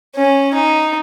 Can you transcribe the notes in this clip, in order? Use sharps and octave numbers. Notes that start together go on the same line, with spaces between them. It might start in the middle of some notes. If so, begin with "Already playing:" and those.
C#4
D#4